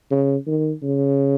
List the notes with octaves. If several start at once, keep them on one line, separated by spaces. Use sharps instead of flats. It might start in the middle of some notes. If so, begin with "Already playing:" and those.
C#3
D#3
C#3